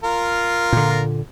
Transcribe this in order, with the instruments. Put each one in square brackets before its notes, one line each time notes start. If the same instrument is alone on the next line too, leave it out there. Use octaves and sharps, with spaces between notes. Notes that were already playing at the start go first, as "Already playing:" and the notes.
[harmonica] F4 A#4
[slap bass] A#2 D3